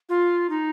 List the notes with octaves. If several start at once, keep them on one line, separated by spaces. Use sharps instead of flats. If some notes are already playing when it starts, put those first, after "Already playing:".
F4
D#4